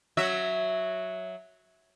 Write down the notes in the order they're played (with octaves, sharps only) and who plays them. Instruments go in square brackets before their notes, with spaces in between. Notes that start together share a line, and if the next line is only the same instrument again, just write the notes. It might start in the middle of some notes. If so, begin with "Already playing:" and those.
[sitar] F#3 F#4 E5